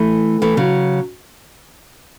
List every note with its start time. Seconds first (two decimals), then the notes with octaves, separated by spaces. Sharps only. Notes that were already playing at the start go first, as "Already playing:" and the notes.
Already playing: E3 A3
0.42 E3 A3
0.57 C#3 F#3